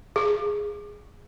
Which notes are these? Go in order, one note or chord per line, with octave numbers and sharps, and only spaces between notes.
G#4